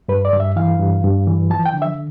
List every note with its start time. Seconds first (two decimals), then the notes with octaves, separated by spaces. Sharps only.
0.08 G2 B4
0.25 D5
0.33 G2
0.40 E5
0.56 E3 F5
0.79 G2
1.04 G2
1.27 E3
1.50 F3 A5
1.66 G5
1.73 D3
1.82 E5